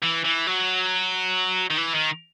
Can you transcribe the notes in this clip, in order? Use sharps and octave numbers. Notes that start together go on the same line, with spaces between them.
E3
E3
F#3
D#3
E3
D#3